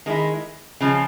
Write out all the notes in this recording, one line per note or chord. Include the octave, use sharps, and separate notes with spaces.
D#3 G#3 E4
C#3 F3 G#3